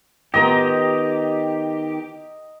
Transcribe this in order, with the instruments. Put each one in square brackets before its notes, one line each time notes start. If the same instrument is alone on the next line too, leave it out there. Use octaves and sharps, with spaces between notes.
[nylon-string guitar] D#3 B3 F4 [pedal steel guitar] G4 [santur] D#5 A#5